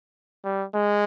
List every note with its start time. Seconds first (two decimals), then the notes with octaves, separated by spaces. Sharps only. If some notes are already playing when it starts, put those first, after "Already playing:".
0.45 G3
0.74 G#3